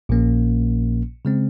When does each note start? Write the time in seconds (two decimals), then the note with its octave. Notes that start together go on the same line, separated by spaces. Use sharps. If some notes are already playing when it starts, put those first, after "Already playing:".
0.09 A#1 A#2 F3 A#3 C#4
1.25 C#3 G#3 C4